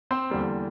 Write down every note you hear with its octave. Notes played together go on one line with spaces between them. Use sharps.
C4 C5
E2 D3 G3 A#3